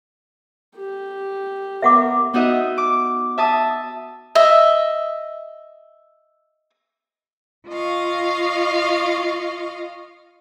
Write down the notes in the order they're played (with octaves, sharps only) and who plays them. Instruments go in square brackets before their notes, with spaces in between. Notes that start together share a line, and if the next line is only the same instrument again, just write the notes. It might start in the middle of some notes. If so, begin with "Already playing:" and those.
[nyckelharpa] G4
[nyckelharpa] B3 A#4 [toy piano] E5 F#5 D6
[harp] B3 D#4 F#4 D#5 E5
D6
E5 A5 D#6
[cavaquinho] D#5 E5
[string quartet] F4 D#5 F5 C#6